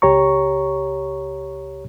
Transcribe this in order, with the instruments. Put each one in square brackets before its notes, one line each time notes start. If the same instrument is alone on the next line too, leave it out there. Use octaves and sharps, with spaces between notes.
[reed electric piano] C#2 G4 C#5 A#5 C#6